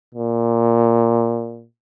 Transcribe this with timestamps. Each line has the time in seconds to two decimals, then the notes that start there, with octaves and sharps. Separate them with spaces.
0.15 A#2